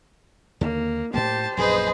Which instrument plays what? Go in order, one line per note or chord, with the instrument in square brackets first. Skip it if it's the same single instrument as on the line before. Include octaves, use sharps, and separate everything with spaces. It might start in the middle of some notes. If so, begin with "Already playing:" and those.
[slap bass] D#2 D3 D#3 [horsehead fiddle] A#3
[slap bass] A2 A3 A#3 [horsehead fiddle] G4 C5 [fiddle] A5
[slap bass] A#1 F#2 A#2 [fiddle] G#4 B4 [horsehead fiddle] C5 D#5